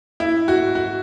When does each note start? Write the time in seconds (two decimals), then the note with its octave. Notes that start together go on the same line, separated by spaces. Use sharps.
0.20 E4
0.48 F#4
0.75 F#4